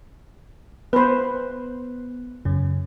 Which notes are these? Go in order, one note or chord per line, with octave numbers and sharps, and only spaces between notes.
B3 B4 C5
F#2 C#3